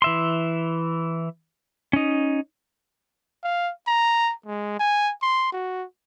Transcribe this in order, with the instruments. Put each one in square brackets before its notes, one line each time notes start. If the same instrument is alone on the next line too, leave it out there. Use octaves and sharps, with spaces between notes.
[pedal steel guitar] E3 E5 C6
C#4 D#4
[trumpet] F5
A#5
G#3
G#5
C6
F#4